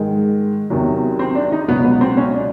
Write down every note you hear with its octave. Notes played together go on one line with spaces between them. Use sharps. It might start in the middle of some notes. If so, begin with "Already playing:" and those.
Already playing: G#2 D#3 G#3
E2 C3 D#3 F#3
C4
D4
D#4
C#2 B2 F#3 B3
B3
C4
C#4
D4